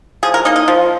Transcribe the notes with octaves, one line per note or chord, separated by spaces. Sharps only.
F3 G#4
A#4
A#3 D#4 D#5
D#5
F3